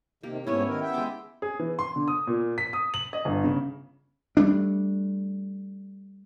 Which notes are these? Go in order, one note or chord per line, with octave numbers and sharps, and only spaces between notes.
C3 D#3 A#3 G4
G#2 A3 B3 C#4 E4 C#5
D#3 A#4
B3 E5 G5
G#3 D6
G#4
E3
C6
D3
D#6
A#2
B6
D#6
F#7
D#5
G1
C#3
G3 A3 D4